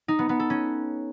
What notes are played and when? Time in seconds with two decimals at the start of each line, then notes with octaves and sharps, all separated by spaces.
0.08 D#4
0.19 B3
0.29 B3
0.40 A4
0.50 C#4